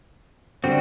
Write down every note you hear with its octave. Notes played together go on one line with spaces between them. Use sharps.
D3 G3 C4 F#4